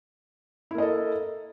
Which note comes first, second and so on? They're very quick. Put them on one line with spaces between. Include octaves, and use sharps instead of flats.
E4 A#3 D#5 A4